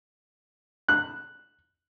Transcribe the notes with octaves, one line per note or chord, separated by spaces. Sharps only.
F#6